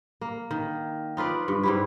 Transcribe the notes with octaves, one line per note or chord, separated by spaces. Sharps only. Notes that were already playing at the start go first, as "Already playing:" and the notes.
A#3
D#3
D#4 F4 B4 D5
G2
G#2 G3 E4